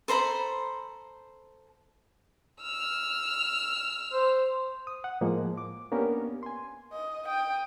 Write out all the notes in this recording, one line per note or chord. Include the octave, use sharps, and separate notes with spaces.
A4 C5 A#5 B5
E6 F6
C5
D#6
F#5
A2 F3 G#3 A#3
D6
A#3 B3 C#4 D4 G4 A#4
G#5 C6
D#5
G5 D#6